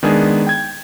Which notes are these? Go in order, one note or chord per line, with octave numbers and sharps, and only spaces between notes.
D#3 G#3 B3 D4 G#4
G5 G#6